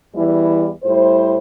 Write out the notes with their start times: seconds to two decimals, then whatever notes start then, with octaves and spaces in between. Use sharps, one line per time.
0.13 E2 E3 G3 E4
0.83 A2 G3 E4 C5